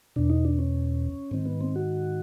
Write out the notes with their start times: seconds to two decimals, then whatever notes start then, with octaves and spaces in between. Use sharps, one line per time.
0.16 E2 B2 D4
0.30 D#4
0.45 D4
0.59 C#4
1.31 G#2 D#3 C4
1.46 B3
1.61 C4
1.76 F#4